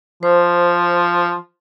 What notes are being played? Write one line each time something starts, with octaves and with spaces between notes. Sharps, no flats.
F3 C5